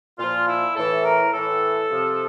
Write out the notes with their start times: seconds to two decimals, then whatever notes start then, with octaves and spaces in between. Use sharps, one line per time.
0.19 A#2 F3 F4
0.48 E4
0.76 A2 E3 A4
1.04 A#4
1.33 A2 E3 A4
1.89 C3 F3